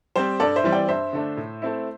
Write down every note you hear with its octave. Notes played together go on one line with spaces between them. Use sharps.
G3 C4 G4 C5
G2 A4 D5
C5 E5
E3 G3 C4
D5 G5
G2 C5 E5
D3 A3 D4
A2
A3 C4 E4